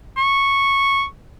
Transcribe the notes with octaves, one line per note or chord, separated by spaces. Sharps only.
C#6